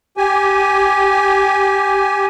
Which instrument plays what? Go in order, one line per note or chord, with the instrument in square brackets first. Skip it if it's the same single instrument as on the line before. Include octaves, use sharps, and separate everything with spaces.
[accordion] G4 G#5